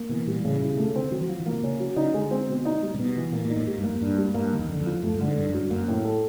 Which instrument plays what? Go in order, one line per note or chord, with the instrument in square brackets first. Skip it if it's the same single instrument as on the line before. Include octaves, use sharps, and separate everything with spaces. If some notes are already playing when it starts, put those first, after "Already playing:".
Already playing: [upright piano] A#3
[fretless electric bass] B2 [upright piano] E3
[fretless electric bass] A#2 [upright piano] G3
[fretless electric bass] A2 [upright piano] C#3
[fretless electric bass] A#2 [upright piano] E4
[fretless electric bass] B2
[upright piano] A3
[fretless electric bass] C3
[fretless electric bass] D3 [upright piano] C4
[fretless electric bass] C#3
[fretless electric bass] D#3 [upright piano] F#3
[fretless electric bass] F3
[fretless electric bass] F#3 [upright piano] F4
[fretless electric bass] E3
[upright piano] A#3
[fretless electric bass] C3
[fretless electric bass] C#3 [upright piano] C#4
[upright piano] F#3
[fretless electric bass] C#3 [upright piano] D#4
[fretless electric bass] D3 [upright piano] G#3
[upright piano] C4
B2
D#4
G3
[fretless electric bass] C3
[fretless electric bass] B2 [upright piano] B3
[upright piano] E3
[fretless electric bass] A#2 [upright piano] A#3
[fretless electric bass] A#2
[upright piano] D#4
[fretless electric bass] A2
[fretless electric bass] G#2 [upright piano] G4
[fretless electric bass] G2
[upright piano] A#3
[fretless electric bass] F#2
[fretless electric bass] G2 [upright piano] D4
[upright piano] G3
[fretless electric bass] G2 [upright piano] A#3
[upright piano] D#3
[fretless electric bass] E2
[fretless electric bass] F2 [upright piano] D3
[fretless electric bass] F2
[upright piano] F3
[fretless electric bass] F#2 [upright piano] A3
[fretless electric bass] G2
[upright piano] D3
[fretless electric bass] G#2
[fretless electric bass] G2 [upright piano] D4
[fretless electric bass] F#2
[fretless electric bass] G#2 [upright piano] F#3
[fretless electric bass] G2
[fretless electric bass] F#2 [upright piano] A#3
[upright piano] A2
A4